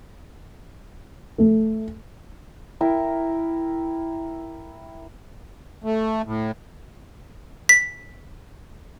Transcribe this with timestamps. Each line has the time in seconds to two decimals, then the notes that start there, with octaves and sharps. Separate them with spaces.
1.38 A3
2.81 E4 A#4 G5
5.84 A3
6.25 A2
7.69 B6